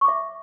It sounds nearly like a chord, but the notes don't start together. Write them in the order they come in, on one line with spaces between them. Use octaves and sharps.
C#6 D6 E5